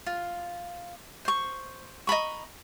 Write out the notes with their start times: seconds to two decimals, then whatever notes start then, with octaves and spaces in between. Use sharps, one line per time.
0.06 F4
1.25 C5 C#6
2.07 D#5 A#5 B5 C#6